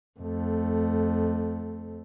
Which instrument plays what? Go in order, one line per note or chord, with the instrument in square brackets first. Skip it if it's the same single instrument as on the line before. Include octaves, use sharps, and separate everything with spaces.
[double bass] F2 A3